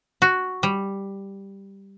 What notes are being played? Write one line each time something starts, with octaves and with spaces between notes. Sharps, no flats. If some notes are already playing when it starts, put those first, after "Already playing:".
F#4
G3